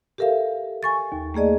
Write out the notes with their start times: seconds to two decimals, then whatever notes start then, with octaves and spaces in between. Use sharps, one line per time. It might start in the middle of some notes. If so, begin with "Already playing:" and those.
0.18 G4 A4 A#4 E5 F5
0.83 G#5 C#6 A6
1.12 D#2
1.34 A3 A#3 G#4 D5 D#5